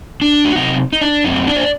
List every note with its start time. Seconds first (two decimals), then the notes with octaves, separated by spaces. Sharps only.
0.22 D4
0.45 F#4
0.56 C3 F#3 C4 D#4
0.93 D#4
1.01 D4
1.24 F#2 F#3 A3 C4 D#4
1.47 D4 D5
1.56 C5
1.63 D5